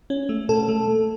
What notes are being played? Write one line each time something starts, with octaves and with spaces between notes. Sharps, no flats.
C#4
A3
B2 A4
A3
A3